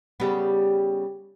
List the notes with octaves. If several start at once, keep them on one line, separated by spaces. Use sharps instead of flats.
C#3 G3 B3